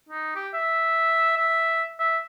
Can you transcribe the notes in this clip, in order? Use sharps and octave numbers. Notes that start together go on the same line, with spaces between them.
D#4
G4
E5
E5
E5